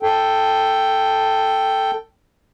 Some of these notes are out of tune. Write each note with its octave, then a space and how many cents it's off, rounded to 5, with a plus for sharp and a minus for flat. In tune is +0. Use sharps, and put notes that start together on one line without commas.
A4 +5 G5 +0